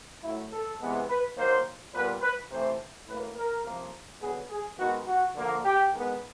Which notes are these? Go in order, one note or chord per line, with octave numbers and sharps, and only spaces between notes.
A2 F#3 A3 E4
A4
C3 E3 G#3 B3
B4
D#3 F#3 A#3 C5
A#2 G3 B3 B4
B4
C3 E3 A3 C5
A2 F#3 A#3 B4
A#4
C3 F3 A#3
D3 F#3 B3 G#4
G#4
D#3 G#3 B3 F#4
F#4
D3 F3 A#3
G4
D#3 G#3 B3